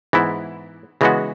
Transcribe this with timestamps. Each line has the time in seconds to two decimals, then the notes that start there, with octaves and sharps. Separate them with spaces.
0.13 G#2 E3 B3 E4
1.01 C#3 E3 G#3 B3 F#4